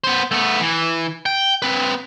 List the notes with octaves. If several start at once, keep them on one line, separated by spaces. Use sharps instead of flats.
B3 C5
A3 B3
E3
G5
C4 B4